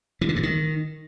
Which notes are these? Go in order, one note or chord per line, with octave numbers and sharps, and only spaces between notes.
E3
D3
G2
D#3